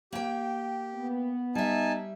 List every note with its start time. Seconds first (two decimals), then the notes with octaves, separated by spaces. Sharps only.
0.13 A#3 G4 G5
0.95 B3
1.55 G3 D#4 E5 G#5 A5